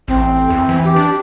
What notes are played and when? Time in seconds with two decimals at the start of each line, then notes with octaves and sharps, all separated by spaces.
0.08 A1 C4
0.50 E2
0.69 E3
0.84 G4
0.96 D4